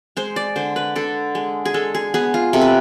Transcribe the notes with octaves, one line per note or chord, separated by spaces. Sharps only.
G#3 C5
D5
D3 C5
B4
D3 A4
G#3
G#4
G#3 A4
G#4
B3 G#4
F4
C3 A4
B4